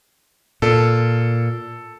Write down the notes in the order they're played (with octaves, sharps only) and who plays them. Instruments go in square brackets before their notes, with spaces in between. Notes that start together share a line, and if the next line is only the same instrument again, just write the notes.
[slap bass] A#2 [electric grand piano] A4